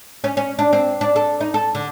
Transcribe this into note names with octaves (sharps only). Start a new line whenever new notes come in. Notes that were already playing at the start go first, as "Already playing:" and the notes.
C#4
C#4
D4
C4
D4
A4
D#4
A4
D3